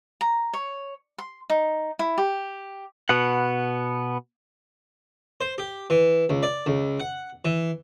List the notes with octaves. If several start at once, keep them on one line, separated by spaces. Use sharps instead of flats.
A#5
C#5
C6
D#4
E4
G4
B2 B3 F#5
C5
G4
E3
C#2
D5
C#2
F#5
E3